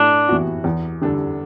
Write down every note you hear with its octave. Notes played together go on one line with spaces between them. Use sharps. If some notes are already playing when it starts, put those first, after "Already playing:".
Already playing: A2 D4
E3 B3 F#4
E2
D3 G3 D4 A4